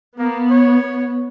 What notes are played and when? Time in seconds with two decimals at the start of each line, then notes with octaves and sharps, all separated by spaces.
0.19 A#3 B3
0.51 C#5